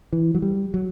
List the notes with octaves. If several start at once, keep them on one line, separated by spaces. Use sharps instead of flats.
E3
F#3
G3
F#3